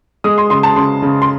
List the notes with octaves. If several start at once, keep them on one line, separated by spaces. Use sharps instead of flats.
G#3 D#6
C6
C#3 C6
A5
C#3 C6
C#3
C6